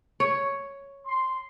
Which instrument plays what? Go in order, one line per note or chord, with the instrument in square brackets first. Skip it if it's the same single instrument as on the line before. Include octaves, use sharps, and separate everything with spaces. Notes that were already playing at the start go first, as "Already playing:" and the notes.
[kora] C#5
[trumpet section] C6